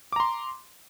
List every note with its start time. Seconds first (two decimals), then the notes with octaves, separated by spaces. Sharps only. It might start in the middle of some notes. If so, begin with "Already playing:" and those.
0.12 D6
0.16 A#5
0.20 C6